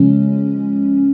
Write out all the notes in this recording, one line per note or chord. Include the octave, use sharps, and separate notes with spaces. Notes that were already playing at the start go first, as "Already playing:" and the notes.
Already playing: C#3 F3 G#3 C#4